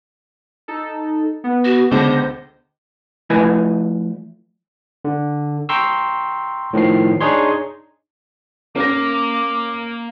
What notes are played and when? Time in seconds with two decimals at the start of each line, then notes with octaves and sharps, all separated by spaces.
0.68 D#4 A4
1.44 B3
1.65 F#4
1.91 C#2 B2 D3 C5 G6 A#6
3.30 F3 A3 E4 B4 D#5 G#5
5.05 D3
5.69 G5 A#5 C6 C#6 E6
6.73 A2 D#3 F3 C7
7.21 D4 D#4 G#4 C#5 C6
8.76 A#3 C#4 F5 D6 A#6